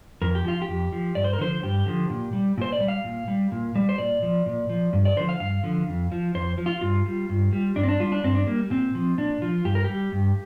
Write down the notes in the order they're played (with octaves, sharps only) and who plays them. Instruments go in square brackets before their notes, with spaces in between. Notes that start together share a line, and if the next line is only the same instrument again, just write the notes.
[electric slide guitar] F2 A#4
G4
F3 F4
G4
F2
F3
G2 D5
C5
A#4
D3 F3 C5
G2 G4
D3 F3
A#2
G3
A#2 C5
D5
G3
F5
A#2
G3
A#2
G3
C5
A#2 D5
F3
A#2
F3
G2
D5
D3 F3 C5
F5
G2 F5
D3 F3
F2
F3
F2 C5
F3
F4
G2 F4
G3
G2
G3
G2 D4
C4
D4
G3 F4
D4
G2 C4
D4
G3 A#3
A#2 C4
F3
A#2 D4
F3 F4
G2 G4
A#4
G3 G4
G2